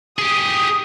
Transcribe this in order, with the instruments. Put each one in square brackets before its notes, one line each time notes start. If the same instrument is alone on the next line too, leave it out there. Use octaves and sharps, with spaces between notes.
[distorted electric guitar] G4 G#4 [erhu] D#6